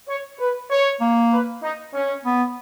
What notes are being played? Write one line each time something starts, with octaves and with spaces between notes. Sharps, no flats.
C#5
B4
C#5
A#3
B4
D#4
C#4
B3